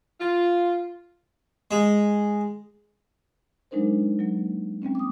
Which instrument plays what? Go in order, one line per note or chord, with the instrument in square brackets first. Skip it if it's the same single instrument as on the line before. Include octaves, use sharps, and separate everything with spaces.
[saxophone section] F4
[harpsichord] G#3
[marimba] F#3 G#3 D4 D#4 A#4 C5
F#3 A#3
G3 A#3 C4 C#4
D6 D#6